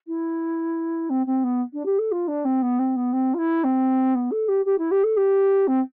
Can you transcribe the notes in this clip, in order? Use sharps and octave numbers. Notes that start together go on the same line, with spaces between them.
E4
C4
C4
B3
D4
G4
A4
F4
D4
C4
B3
C4
B3
C4
F4
E4
C4
B3
A4
G4
G4
E4
G4
A4
G4
C4